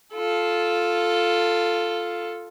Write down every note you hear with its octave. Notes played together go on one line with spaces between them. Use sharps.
F4 A4